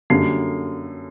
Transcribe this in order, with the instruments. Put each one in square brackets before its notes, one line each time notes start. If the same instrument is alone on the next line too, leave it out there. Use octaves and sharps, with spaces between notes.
[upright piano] F#2 D3 G3 A#3 C7